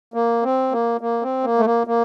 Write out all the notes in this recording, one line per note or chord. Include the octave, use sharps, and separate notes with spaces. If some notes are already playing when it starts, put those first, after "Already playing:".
A#3
C4
A#3
A#3
C4
A#3
A3
A#3
A#3